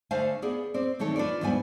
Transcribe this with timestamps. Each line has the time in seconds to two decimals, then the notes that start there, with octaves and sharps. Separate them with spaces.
0.11 D3 A3 D4 C5 F5 G#5
0.42 B3 G#4 D5
0.74 C4 D5
0.99 D#3 E3 A3 A4 C#5
1.16 D4 F4 B4 D5
1.41 E2 G#2 G3 B3 D5 G#5